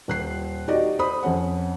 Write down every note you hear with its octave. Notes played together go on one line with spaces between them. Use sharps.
D#1 F#6 C7
D#4 F#4 G4 D5 D#5
C5 B5 D#6
F2 C#4 F#5